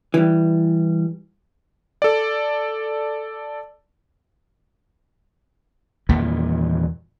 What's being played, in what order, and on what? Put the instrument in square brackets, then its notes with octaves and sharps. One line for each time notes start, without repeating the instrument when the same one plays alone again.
[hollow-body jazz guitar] E3 G3
[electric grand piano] A4 D5
[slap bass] E2 A#2 D#3 E3